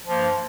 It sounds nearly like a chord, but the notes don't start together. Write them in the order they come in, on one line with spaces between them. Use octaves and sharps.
F3 A#3 G2